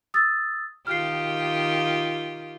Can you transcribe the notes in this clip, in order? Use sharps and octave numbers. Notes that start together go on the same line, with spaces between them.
D#6 E6 A6
D#3 F4 G4 F6 C7